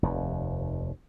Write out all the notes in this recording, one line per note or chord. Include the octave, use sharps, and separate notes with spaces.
F1 D#2